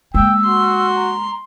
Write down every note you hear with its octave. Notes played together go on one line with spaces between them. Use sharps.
G#3 A#3 G5 E6
F#4 C6
A#5